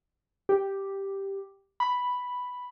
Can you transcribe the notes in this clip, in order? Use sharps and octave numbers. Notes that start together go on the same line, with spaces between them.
G4
B5